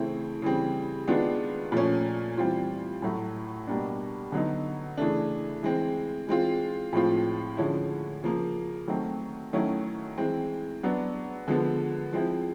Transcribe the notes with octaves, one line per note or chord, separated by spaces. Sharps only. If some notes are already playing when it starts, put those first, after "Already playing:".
Already playing: C#3 E3 A3 C4 E4
C#3 E3 G3 C4
D#3 G#3 B3 D4 F4
A#2 F3 A3 C#4
E3 G3 C4 F4
A2 F#3 A3
B2 G3 A#3 D4
D3 F#3 B3 D#4
C#3 E3 A3 D4
E3 G#3 C4
E3 G#3 C4 F4
A2 F3 G#3 C4 F4
D3 F3 G#3 C#4 E4
C#3 F3 A#3
D#3 F#3 A3 C4
D#3 F#3 A3 C#4 E4
E3 G#3 C4
F#3 B3 D4
D3 F3 G#3 B3
F3 G#3 C4 E4